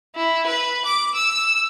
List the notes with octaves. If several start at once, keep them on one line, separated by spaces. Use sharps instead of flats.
E4
B4
D6
E6